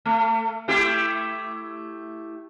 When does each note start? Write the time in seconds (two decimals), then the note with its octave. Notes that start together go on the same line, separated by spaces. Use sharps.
0.05 A3
0.68 A3 E4 G4